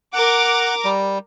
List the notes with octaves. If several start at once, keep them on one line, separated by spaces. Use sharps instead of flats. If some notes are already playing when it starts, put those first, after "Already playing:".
A#4 F#5 D6
G3